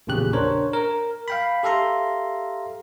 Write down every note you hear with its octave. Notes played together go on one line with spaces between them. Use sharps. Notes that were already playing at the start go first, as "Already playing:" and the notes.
A#1 E2 A#2 C#3 G4 F#6
D4 A#4 C5 C#5
A#4
F5 G5 B5
G4 A4 E5 F5 A#5 C6